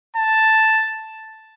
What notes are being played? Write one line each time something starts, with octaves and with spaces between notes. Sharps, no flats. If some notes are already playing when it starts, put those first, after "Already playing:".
A5